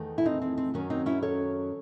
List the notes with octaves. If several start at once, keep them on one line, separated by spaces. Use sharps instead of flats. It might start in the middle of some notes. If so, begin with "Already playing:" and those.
Already playing: E2 D#3 A3
E4
C4 D#4
C4
C4
F#2 D#3 F#3 C#4
C4 D#4
C#4 E4
A4 C#5